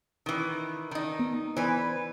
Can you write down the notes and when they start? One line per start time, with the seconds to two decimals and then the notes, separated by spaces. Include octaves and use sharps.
0.26 D#3 E3
0.91 D#3 D#4
1.19 B3
1.57 E3 B4 C5 D5 G#5